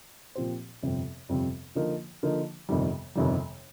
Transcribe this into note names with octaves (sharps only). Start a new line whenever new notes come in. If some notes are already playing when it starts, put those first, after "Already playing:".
A#2 F3 C4 G4 C5
G1 F2 C3 G3 C4
G1 F2 C3 G3 C4
D3 F3 A#3 D#4
D3 F3 A#3 D#4
G1 F2 C3 D#3 G3
G1 F2 C3 D#3 G3